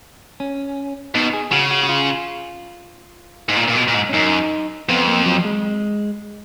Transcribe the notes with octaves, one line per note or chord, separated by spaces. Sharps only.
C#4
B2 D#4
G#4
C#3 F#4
F#4
F#4
F4
G#2
A#2
A#2
B2
A#2
G#2
C#4
F#2 D#4
F2 B3
A#3
F#3
G#3